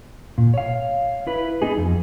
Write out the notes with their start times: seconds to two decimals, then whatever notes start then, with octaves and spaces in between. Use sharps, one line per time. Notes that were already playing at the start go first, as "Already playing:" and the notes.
0.38 A#2
0.54 C#5 F5
1.27 E4 B4
1.62 B3 D#4 G#4
1.77 F2